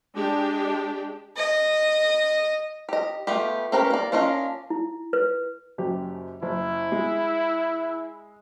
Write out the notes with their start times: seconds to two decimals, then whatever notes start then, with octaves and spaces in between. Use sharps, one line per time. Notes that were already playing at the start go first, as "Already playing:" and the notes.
0.15 G#3 D4 G4
1.37 D#5
2.89 G4 D#5
3.27 A3 B3 F4 G4
3.72 C4 C#4 G4 A#4 B4
3.90 A#3 D5
4.12 A#3 C#4 D4 F4 D#5
4.70 E4
5.13 B4
5.78 F#1 F#2 G4
6.43 F#1 E4
6.92 G#3